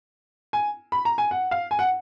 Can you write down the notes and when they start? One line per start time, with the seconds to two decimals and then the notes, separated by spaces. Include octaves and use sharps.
0.53 G#5
0.92 B5
1.05 A#5
1.18 G#5
1.31 F#5
1.51 F5
1.71 G#5
1.79 F#5